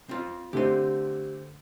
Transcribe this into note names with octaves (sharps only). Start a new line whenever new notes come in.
C4 F4
D3 A3 C4 G4 C6